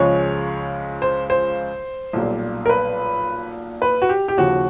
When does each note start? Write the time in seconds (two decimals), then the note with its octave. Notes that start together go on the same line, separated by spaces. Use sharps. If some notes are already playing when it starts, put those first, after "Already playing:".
Already playing: C#2 C#3 F3 G#3 C#5
1.02 C5
1.30 C5
2.13 B1 A#2 G3
2.66 A#4
2.69 B4
3.82 B4
4.02 F#4
4.09 G4
4.28 G4
4.37 D#2 C#3 F3 F#4